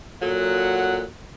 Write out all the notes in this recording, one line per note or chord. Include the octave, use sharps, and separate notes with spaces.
A#2 F#3 A4 F#5